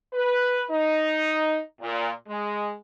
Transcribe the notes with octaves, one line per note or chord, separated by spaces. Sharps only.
B4
D#4
A#2
G#3